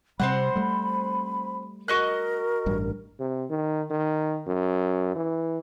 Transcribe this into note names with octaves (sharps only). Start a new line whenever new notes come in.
C3 G3 C4 C5 F#5 B5
G3 A3
F#4 A#4 D#5 F#6
A1 G2 G3
C3
D#3
D#3
F#2
E3